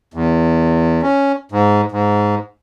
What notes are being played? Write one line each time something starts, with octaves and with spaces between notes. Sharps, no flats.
E2
C#4
G#2
G#2